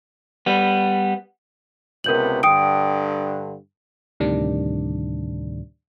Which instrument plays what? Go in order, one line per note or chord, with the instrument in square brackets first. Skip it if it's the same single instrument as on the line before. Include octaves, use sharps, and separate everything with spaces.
[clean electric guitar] G3 B3
[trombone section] C#2 C3 B3 [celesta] A#4 G6 F#7
[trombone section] G2 D3 [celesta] G5 D#6 D7
[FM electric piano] D2 A2 C3 D#3 G3 D4